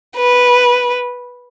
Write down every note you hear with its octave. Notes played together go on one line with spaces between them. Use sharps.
B4